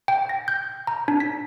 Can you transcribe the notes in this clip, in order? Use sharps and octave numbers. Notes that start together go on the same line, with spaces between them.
G5
A#6
G6
A#5
D4
B6